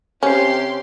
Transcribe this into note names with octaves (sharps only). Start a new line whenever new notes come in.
C3 C#4 G4 C#5 C6 G6 C7